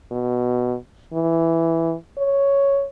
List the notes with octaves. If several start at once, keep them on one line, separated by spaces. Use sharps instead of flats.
B2
E3
C#5